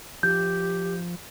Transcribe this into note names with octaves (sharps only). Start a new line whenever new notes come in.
F3 G4 G6